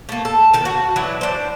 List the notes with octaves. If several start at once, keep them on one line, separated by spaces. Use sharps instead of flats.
A3 A#3
A4
D#3 A4
F#4
E3 F#3 D4 E4
D4 C5